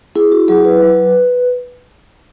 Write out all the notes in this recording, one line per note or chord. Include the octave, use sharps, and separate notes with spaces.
E4 G#4
F#4
F#3 G#4
B4
F#3